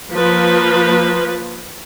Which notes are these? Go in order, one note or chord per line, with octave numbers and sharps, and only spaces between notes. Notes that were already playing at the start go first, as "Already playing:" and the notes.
F3 A#3 B4